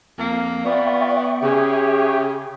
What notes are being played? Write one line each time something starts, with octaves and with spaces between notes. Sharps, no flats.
F2 A#3
B3 F4 D5 E5 G5 C#6
C#3 G4 G#4